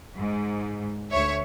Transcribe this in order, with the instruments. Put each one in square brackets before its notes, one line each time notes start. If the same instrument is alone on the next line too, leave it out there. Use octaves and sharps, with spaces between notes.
[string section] G#2
D2 C#5 E5